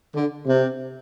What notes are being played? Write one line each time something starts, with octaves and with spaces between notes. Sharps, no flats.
D3
C3